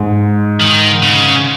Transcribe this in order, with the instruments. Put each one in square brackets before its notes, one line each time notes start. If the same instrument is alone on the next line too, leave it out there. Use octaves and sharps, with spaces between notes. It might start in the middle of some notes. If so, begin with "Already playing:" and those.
Already playing: [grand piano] G#2
[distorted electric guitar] D#3
C#3